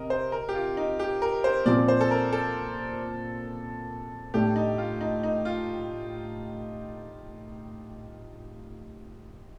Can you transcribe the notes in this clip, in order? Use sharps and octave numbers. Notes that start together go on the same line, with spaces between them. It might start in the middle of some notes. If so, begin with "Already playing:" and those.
Already playing: C3 A#4 D#5
C5
A#4
G4
F4
D#4
G4
A#4
C5
A#2 F3 C4 D5
C5
A4
A#4
A4
A2 A3 D4 G4
D#4
F4
D#4
D#4
F4